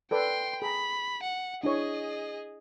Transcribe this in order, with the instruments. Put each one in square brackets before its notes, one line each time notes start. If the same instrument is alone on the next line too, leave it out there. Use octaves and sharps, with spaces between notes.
[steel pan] A4 B4 D5 [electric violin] G5 C6
[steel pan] G#4 A#5 [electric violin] B5
[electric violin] F#5
[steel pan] D4 E4 C#5 [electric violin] G#4 D#5